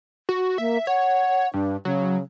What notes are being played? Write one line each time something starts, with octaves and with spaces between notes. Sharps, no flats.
F#4
A#3 E5
C#5 F#5
G2 D4
C#3 F#3